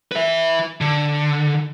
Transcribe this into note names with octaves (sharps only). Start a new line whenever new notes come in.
B4 E5
D3